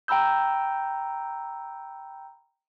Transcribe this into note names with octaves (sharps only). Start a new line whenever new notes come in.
G5 A#5 B5 E6 G6